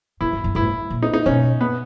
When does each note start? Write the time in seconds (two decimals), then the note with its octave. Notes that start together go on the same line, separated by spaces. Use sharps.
0.21 G#2 E4
0.33 G2
0.44 G2
0.55 G#2 E4
0.90 A#2
1.03 D#4
1.14 D#4
1.26 B2 C#4
1.61 B3